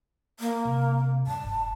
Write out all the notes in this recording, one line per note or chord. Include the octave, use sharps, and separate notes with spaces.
A#3
C3
G2 A5
F1